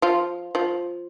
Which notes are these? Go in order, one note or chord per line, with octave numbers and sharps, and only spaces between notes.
F3 F4
F3 F4